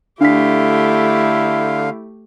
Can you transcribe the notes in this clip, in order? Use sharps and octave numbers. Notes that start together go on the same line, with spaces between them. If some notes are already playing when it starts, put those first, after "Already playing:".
D3 A3 D4 E4 G4 F5 B6